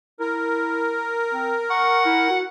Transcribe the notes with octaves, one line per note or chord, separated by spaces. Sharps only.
E4 A#4
C4
F#5 C#6
E4
F#4